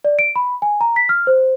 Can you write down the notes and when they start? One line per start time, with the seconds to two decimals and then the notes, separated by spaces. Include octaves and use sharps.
0.05 D5
0.19 D7
0.36 B5
0.62 G#5
0.81 A#5
0.96 B6
1.09 F6
1.27 C5